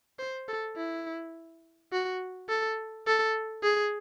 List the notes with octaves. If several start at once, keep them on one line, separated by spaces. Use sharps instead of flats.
C5
A4
E4
F#4
A4
A4
G#4